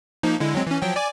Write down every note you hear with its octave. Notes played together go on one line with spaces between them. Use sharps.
F3 A#3 D#4
D3 G#3 E4
F#3 G#3 C4
E3 C#4
F3 F#3 G5
D5 G#5 D6